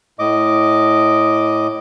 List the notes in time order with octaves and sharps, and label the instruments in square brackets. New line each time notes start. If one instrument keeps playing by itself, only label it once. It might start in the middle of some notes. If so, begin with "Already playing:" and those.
[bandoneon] A2 D#5 D6